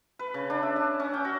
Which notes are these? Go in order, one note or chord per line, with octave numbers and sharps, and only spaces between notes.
B4
C#3
D4
E5
A5
C#4
G5
F#4